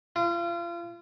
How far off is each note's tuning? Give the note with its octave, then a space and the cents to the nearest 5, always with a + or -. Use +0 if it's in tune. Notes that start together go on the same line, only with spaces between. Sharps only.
F4 -35